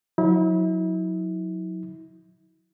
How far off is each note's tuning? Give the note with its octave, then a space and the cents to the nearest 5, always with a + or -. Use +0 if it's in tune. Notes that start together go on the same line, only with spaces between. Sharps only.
F#3 -30 E4 -40